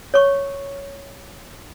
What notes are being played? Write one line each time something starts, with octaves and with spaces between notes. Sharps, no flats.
C#5 C#6